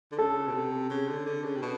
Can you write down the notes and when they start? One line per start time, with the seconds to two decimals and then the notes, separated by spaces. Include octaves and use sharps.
0.12 D3
0.18 C#3 A4
0.47 B2
0.54 C3
0.90 C#3
1.09 D3
1.26 D3
1.44 C#3
1.56 C3
1.62 B2